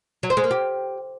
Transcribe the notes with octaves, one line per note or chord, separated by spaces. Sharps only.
F#3
C5
G#3
A#3
G4